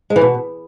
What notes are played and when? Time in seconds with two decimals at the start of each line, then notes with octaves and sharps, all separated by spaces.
0.10 G#3
0.16 E3
0.21 B2